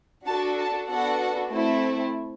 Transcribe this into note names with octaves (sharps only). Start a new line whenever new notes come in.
D4 F#4 A4 A5
A5
B3 D4 F#4 A4 F#5
A3 C4 E4